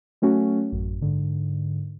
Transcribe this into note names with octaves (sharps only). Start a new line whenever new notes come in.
F#3 A3 C#4 F#4
A1 F#2
G#2 D3